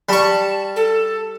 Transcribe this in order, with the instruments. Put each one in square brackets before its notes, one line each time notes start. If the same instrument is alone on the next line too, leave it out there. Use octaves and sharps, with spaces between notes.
[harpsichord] G3 C#6 [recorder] A5
[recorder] A4